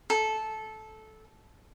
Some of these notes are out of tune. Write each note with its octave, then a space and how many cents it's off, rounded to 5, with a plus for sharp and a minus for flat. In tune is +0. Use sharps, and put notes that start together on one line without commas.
A4 -15